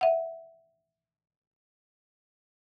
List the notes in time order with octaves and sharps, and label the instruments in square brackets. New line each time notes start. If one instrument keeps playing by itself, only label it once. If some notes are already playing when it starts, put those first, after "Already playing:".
[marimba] E5 F#5